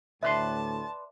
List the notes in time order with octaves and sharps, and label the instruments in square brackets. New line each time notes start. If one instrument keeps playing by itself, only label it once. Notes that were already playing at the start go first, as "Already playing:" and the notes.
[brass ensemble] D2 A2 [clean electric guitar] B4 D5 C6 [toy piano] E5 [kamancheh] A5